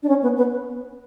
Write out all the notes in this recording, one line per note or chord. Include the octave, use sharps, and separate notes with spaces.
D4
C#4
B3
B3